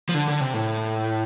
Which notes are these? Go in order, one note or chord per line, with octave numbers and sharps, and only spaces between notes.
F3
D3
D3
C3
A2